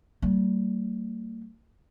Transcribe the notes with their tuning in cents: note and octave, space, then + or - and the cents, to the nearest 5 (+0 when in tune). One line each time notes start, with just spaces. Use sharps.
G3 -40 A#3 -45